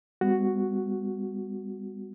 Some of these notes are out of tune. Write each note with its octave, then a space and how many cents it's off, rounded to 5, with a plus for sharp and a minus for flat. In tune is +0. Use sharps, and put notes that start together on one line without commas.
G3 +40 B3 +35 F#4 +0